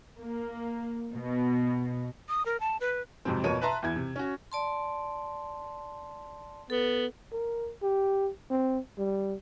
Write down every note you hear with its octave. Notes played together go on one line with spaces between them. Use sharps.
A#3
B2
D#6
A#4
A5
B4
F2 G#2 C3 F#3 C4
F2 B2 A#3 C#5 D#7
B4 E5 A5 A#5 C6
E2 E4 G#6
C3
C#4 F#4
D5 A5 C6
B3 A4
A#4
G4
C4
G3